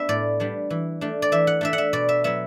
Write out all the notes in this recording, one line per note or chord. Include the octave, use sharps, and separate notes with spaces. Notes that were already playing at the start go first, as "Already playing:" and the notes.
Already playing: B3 D4 E5
A2 D5
G3 B3 D4
E3
A3 D4
D5
E3 E5
F#5
A3 D4 E5
F#5
E5
B2 D5
E5
F#3 B3 E5